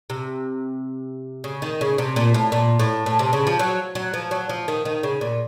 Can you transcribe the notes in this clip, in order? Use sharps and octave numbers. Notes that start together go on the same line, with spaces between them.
C3
C#3
D#3
C#3
C3
A#2
A2
A#2
A2
A2
C3
C#3
F3
F#3
F#3
F3
F#3
F3
D#3
D#3
C#3
A#2